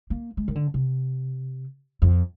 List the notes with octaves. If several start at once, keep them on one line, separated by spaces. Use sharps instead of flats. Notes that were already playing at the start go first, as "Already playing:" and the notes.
A#3
G#3
D#3
D3
C3
F2